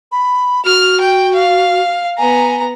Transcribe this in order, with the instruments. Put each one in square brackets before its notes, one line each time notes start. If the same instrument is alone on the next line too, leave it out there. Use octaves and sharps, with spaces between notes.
[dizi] B5
[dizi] F#4 [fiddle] F6
[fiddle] G5
F5
[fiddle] B3 A#5 [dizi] G#5